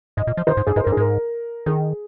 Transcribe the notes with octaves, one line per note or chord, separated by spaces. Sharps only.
G#2 D#5
A#2
F3
D#3 C5
G#2
G2 G#4
G#2 C5
G2 A#4
G#4
G#2 A#4
D#3 G#4